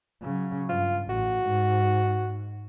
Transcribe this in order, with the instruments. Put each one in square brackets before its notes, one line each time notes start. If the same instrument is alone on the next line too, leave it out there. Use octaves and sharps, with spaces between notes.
[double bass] C#3 F#3
[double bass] G2 [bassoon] F4
[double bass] A1 [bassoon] F#4
[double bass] G#2